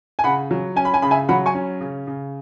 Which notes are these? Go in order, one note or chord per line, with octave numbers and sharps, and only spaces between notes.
G#5
C#3 F#5 B5
F#3
C#4 G#5
B5
G#5
C#3 B5
E5 G#5
F#3 F#5 B5
G#5 C#6
C#4
C#3
C#3